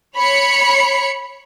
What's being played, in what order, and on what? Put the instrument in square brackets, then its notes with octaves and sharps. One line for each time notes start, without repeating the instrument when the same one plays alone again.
[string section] C#5 B5 C#7